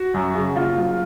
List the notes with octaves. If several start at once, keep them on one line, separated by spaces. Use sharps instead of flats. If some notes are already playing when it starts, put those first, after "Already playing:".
Already playing: F#4
F#2
C#3
F#1 F4
F#3